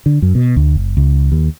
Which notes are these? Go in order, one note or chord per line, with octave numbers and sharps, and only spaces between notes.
D3
F#2
B2
D2
F#1
C#2
D#2